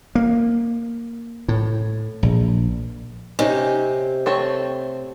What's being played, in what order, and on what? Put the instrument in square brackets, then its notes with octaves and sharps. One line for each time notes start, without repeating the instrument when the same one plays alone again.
[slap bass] A#3
A2
A#1
[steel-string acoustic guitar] C3 [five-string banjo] C#4 D#4
[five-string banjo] A3 C4 C#5